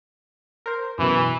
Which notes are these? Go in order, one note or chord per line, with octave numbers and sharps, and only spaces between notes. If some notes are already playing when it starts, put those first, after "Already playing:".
A#4 C5
F#2 B2 E3